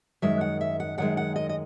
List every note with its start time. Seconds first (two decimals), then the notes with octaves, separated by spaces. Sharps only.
0.22 F#2 D#3 G#3 E5
0.41 F#5
0.61 E5
0.80 F#5
0.98 F#2 D#3 G#3 F#5
1.17 F#5
1.36 D#5
1.49 D#5